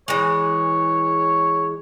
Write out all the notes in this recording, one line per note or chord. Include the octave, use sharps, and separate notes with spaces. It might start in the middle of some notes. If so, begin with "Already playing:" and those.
E3 G#3 C#5